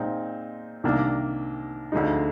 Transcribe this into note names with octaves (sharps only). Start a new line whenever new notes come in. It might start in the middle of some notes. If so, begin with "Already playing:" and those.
Already playing: A#2 G#3 C4 D#4
C2 C3 D#3 A#3 D4
D2 D3 F3 G#3 D#4